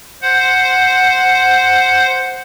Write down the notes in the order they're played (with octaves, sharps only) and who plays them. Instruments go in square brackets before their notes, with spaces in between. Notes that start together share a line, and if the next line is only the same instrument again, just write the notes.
[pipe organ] C5 F#5